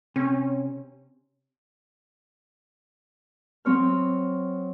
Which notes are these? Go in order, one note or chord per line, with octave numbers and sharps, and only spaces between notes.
C3 C#4
F#3 C4 C#5 F6